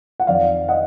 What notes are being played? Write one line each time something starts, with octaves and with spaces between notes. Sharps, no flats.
F#5
F2 D#3 D5 F5
D#5 F#5